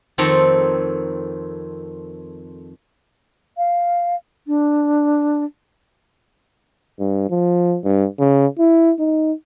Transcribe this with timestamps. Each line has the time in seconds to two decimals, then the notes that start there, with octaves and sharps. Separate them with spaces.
0.18 F2 D#3 A3 C4 A4 A#5
3.57 F5
4.47 D4
6.99 G2
7.30 F3
7.84 G2
8.19 C#3
8.58 E4
8.99 D#4